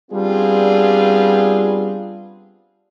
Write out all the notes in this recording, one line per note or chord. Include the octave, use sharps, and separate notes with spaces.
G3 B3 C4 D4 F4 G#4